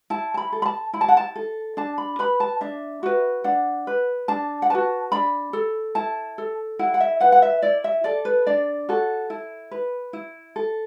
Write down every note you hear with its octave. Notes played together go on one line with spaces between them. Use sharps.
E4 A5
A5
B5
A4
B5
A5
E4 B5
A5
F#5
A5
A4
D4 A5
B5
B4 B5
A5
D4 E5
F#4 B4
D4 F#5
B4
D4 A5
F#5
F#4 B4 A5
D4 B5
A4
E4 A5
A4
E4 F#5
F#5
E5
B4 F#5
F#5
E5
E4 D5
E5
A4 D5
B4
D4 D5
F#4 A4
E4
B4
E4
A4